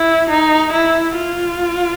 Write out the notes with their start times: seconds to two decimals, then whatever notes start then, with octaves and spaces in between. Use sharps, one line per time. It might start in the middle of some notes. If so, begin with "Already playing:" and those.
Already playing: E4
0.30 D#4
0.73 E4
1.17 F4